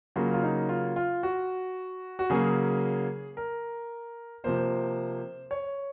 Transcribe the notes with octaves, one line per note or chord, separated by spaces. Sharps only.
C#3 F#3 A#3 F4
F4
D#4
F4
F4
F#4
F#4
C#3 F#3 A#3 G#4
A#4
C3 F3 A#3 C5
C#5